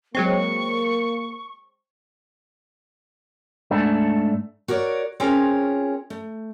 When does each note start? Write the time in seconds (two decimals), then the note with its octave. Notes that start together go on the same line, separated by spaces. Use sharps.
0.15 F#3 G#3 A#3 C4 C#6
3.71 G#2 A3 D4
4.68 F#4 A#4 C#5 D5
5.20 C4 C#4 F4 G#4 A#4 C#5
6.10 A3